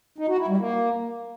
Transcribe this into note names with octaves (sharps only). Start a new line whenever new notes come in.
D#4
F#4
E4
G3
A#3